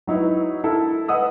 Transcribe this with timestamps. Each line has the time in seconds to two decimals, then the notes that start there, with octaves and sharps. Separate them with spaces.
0.07 F#3 D#4 E4 B4
0.64 E4 A4 A#4
1.08 B4 D#5 F#5 D#6 E6